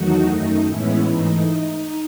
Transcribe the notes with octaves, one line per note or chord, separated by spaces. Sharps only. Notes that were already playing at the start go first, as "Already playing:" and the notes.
Already playing: E2 D#3 F#3 A3 D#4 F#4
F#2 D#3 A3 D#4
A2 E3 G#3 B3 C#4 E4
G#2 E3 A3 D#4